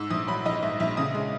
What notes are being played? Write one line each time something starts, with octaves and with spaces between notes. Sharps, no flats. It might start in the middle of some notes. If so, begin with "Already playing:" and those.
Already playing: G#2 E6
A#1 D#6
F#3 B5
A#1 D#5
G#2 E5
A#1 E5
C#3 D#6
G#3